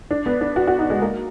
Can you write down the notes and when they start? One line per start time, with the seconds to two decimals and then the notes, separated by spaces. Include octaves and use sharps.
0.11 D4
0.26 B3
0.41 D4
0.56 F#4
0.67 F#4
0.79 D#4
0.90 G#3
1.02 A#3